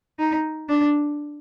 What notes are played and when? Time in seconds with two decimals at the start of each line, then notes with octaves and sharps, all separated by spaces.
0.19 D#4
0.69 D4